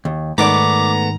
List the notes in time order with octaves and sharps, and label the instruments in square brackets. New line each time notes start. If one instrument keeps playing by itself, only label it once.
[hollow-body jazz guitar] D#2
[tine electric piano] G#2 D#3 [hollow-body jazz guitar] A3 B3 D5 [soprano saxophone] A#5 [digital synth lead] D6